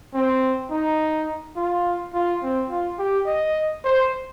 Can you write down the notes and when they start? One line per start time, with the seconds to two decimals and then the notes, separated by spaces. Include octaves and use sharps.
0.14 C4
0.71 D#4
1.56 F4
2.14 F4
2.42 C4
2.70 F4
2.99 G4
3.26 D#5
3.84 C5